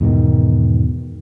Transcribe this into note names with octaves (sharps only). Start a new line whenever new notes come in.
E2 G#2 B2 D#3